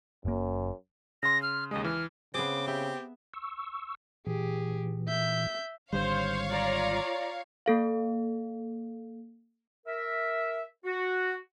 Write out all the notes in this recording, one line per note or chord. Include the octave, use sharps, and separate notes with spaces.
F#1 F#2 A#3
C#3 C6 A#6
F6
D#2 C#3 G#3 D#5
E3 F6
C#3 B3 C4 G#4 D6
G4 E5
C#6 E6
A#2 E3 G4 G#4
E5 G6
G#1 D3 G3 C5 C#5 F5
F4 D5 A#5
A#3 A4 F5
A#4 E5
F#4